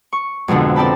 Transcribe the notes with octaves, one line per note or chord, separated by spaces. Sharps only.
C#6
F2 G#2 B2 D3 F3
C4 D5 G5 A5 B5